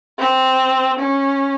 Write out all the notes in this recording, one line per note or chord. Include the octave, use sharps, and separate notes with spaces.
C4
C#4